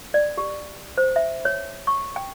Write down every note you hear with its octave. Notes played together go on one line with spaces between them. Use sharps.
D5
G4
C5
E5
C#5
C#6
G5